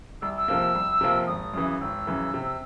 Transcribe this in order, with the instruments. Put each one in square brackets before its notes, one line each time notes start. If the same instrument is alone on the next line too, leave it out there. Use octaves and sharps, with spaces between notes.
[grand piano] C2 [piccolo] E6
[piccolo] E6
[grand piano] C3 F3 A#3
C2
C3 F3 A#3
[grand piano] G#1 [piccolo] D#6
[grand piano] F#2 C#3 E3
[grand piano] G#1 [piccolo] E6
[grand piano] F#2 C#3 E3
C3